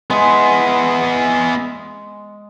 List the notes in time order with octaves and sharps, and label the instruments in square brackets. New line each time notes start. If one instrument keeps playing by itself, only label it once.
[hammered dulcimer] G#3 [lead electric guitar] B3 G#4